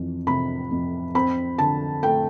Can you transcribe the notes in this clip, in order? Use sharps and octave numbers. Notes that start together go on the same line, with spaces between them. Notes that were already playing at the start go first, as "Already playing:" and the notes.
Already playing: F2 E3
C3 B5
F2
C4 B5
D3 A5
A3 G5